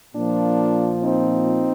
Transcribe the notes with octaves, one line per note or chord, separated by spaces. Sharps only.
A#2 F3 A#3 D4
C4 D#4